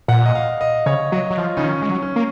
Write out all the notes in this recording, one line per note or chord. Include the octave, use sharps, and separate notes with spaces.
A#2 F#5
D#5
F5
D#5
C#3 C#5
F#3 D#5
F#3
F3 F4
C#3 D#4
D#3 C#4
G#3
F#3
C#4
A#3